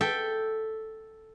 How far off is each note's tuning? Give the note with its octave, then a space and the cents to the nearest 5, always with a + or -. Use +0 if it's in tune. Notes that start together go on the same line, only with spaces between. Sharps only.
A4 +0 E5 +0 G5 +0